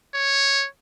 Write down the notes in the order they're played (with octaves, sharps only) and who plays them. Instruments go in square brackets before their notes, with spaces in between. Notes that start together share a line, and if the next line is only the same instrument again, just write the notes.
[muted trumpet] C#5